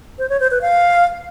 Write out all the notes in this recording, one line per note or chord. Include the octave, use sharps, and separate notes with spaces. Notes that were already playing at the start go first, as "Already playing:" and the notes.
C5
C#5
C5
B4
F5